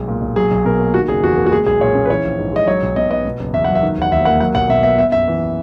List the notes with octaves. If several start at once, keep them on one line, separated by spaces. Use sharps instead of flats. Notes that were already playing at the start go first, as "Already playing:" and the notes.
Already playing: B1 G#3
A#2
B1
F#3 G#4
B1
B2 A#4
A#3
D#3 F#4
F#1 G#4
E2 F#4
A#3
F#4
G#3 G#4
B1 G#4
A#2 C#5
C#4
B4
E3 C#5
A#1
G#2
G#3 D#5
F#3 C#5
B1
B2 D#5
B3 D#5
B2
F#1
E2 E5
F#3 F#5
E5
D#3
E1 F#5
D#2 E5
A#3 F#5
F#3 F#5
B1 F#5
B2 E5
B3 E5
B3 E5
F#2 E5
E3